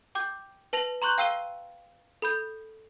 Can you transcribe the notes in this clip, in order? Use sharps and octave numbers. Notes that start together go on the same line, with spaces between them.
G5 D6 G6
B4 A5 A#6 F7 F#7
A#5 C6 C#6 F#6 G6
F5 G5 E6 C7 D#7 G7
A4 B5 G6